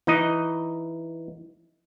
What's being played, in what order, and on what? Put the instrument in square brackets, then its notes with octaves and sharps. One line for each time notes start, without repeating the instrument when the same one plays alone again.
[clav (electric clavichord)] E3 D#4 D#5